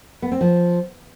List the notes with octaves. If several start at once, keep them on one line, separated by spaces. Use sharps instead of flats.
B3
C4
F3